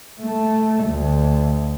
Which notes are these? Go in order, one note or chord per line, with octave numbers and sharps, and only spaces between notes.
A3
D2